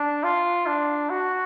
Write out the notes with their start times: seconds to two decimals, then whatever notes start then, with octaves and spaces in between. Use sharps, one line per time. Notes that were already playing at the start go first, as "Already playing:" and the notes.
Already playing: D4
0.24 F4
0.67 D4
1.10 F#4